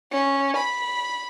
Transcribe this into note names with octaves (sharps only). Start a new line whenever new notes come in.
C#4
B5